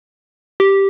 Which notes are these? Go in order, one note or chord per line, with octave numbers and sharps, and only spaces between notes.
G4